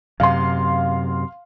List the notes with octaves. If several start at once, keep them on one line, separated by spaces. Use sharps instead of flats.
F#2 C3 F5 C6